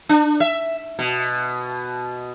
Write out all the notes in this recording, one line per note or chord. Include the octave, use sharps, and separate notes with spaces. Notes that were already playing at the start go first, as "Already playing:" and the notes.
D4
E5
B2